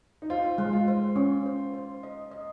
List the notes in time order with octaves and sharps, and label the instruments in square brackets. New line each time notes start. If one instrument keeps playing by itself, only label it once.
[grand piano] D#4
[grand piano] F4 [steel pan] C5
[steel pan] G#3
[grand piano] F4
[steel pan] C5
C#4
C5
C5
D#5
D#5